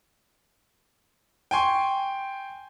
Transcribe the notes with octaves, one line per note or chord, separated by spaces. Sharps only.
G5 G#5 C6 C#6